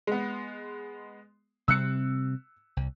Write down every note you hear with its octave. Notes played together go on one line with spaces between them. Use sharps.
G#3 B3
C3 G3 C4 E6 F#6 C#7
C2